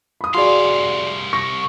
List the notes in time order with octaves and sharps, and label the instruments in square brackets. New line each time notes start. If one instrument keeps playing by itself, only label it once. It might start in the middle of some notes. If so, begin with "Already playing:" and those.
[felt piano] B5 D#6
[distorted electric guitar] C2 F5 [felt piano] F#4 G#4 D5 [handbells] C6
[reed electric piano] C#6 [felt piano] A#6